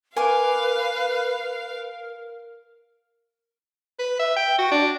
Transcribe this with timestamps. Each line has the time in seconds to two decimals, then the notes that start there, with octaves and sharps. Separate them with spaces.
0.17 A#4 B4 F5 G#5 D6
3.99 B4
4.19 E5
4.36 G5
4.59 F#4
4.72 D4